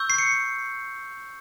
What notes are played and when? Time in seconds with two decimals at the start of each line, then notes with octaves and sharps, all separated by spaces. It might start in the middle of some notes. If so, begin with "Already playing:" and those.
Already playing: C#6 E6 G6
0.10 C7
0.18 C#7